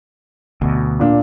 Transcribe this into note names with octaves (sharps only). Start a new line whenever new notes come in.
D2 B2
A#2 D4